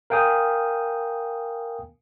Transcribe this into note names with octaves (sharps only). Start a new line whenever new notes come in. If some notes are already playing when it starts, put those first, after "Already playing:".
A#4 F5 G5 G#5 D#6